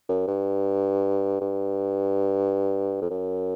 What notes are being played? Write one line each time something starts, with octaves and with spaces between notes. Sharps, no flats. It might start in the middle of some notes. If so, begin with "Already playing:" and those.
F#2
G2
G2
F2
F#2